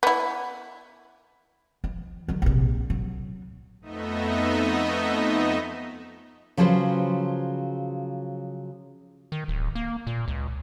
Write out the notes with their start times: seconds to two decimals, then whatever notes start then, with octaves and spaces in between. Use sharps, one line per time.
0.03 B3 E4
1.84 F3
2.28 D3 F#3
2.42 A#1 C3
2.90 F#3
3.81 F2 A3 B3 D#4 D#5 E5
6.57 C#3 F3 F#3 G#4 B4 C5
9.32 D#3
9.48 D1
9.75 A#3
10.07 A#2
10.28 C#2